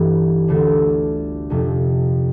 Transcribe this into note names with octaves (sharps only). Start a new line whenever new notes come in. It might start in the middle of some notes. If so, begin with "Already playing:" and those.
Already playing: G1 G2 E3
D2 D3 A3 D4 A4
F1 F2 C3 F3